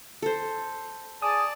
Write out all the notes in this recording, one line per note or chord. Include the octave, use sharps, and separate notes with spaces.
A4 C5
G#4 D5 A5 D#6